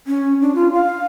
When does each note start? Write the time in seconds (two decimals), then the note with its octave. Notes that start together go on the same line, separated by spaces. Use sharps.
0.07 C#4
0.41 D4
0.55 F4
0.73 F5